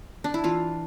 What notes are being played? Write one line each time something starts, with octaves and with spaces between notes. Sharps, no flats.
D4
E4
E3 F4